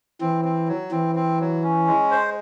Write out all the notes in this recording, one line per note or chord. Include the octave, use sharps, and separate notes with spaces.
E3 C4
C4
F#3
E3 C4
C4
F#3
C#4
G#3
C5